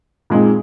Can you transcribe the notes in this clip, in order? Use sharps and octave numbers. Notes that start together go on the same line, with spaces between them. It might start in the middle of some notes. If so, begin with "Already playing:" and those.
A#2 G#3 C4 D#4